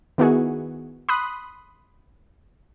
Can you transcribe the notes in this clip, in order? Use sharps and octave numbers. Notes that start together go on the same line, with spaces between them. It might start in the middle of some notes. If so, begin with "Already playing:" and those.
D#3 B3 E4 F#4 G#4
B5 C6 D#6 F#6